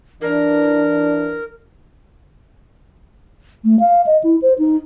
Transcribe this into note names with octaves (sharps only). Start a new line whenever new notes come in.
E3 D4 A#4
A3
F5
D#5
E4
C5
D#4